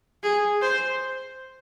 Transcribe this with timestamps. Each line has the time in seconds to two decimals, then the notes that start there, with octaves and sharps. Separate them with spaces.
0.23 G#4
0.62 C5